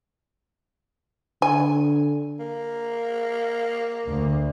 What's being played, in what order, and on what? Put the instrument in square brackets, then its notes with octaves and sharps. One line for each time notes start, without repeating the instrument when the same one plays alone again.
[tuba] D3 [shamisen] G#5
[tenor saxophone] A#3
[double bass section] D2